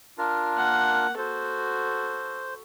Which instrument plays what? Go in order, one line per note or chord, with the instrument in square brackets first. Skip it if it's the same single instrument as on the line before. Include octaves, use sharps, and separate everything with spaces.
[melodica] D4 F4 A#4
[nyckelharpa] A#3 F#5
[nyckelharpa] F#4 A4 [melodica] C5